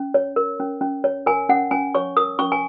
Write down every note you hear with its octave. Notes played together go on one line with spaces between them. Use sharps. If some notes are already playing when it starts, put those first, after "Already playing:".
Already playing: C#4
C#5
A#4
C#4
C#4
C#5
A#4 G#5
C#4 F#5
C#4 G#5
C#5 C#6
A#4 D#6
C#4 C#6
G#5